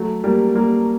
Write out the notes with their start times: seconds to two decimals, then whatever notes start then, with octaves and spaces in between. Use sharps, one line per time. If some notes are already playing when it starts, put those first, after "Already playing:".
Already playing: F#3 A3
0.24 G3 A#3
0.55 G3 A#3